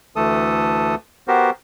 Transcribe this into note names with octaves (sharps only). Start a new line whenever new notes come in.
D2 E3 A3 A4 A5 D#6
B3 F#4 G4 A#4 C5